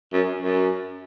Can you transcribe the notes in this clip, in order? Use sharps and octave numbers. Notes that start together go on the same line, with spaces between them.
F#2
F#2